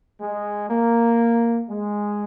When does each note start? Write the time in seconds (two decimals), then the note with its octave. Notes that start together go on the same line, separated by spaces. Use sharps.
0.21 G#3
0.70 A#3
1.70 G#3